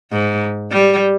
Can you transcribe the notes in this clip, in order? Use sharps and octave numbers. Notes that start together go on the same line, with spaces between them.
G#2
G3